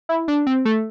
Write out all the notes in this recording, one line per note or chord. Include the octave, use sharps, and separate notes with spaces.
E4
D4
C4
A3